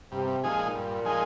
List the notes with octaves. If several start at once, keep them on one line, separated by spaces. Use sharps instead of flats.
G2 C3
A#2 F3 G#3 D#4 G#4
G2
F3 G#3 D#4 G#4